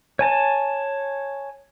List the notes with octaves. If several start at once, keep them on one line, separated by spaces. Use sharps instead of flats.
C#5 G#5 A5